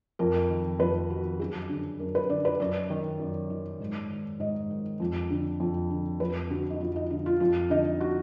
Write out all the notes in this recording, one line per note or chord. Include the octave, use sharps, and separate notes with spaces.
F2 A#4
D#3
F2 B4
D#3 F#4
F#2 G#4
D3
F#2 A#4
B4
D3 D5
B4
F#2 D5
D#3
F#2
D#3
G#2
D#3
G#2 D#5
D#3
F2
D3
F2
D3
F2 B4
D3 F#4
D#4
F2 F4
D#4
D3 D#4
F4
F2 F4
D3 D#4
F#4